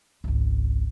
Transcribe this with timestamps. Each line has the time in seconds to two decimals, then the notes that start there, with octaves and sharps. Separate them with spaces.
0.24 G#1 C#2